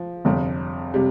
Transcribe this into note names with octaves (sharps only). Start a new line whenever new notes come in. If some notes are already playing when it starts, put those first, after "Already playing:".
Already playing: F3
G1 F2 C3 G3
C3 G3